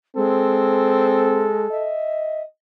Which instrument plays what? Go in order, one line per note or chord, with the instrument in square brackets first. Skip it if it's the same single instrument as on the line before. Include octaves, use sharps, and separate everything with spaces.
[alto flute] G#3 [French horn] C4 [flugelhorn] A4
[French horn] D#5 [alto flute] E5